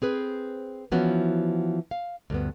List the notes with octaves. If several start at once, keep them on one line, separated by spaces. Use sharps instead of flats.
C4 G#4 B4 C5
E3 F3 B3 C#4 F#4
F5
D2 G2 B3